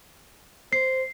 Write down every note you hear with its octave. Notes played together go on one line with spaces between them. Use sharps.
C5 C7